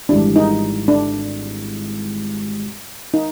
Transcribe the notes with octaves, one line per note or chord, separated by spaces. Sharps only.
G#1 G#2 E3 G3 D4
D#4
D4
D#4